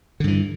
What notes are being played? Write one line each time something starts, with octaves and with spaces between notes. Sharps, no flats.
G2 D3 E3